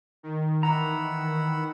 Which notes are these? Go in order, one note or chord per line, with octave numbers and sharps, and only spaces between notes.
D#3
E3 F#5 A#5 B5 E6